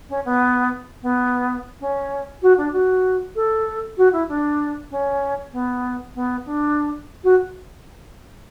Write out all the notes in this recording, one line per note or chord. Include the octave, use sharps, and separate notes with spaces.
C#4
B3
B3
C#4
F#4
D4
F#4
A4
F#4
E4
D4
C#4
B3
B3
D4
F#4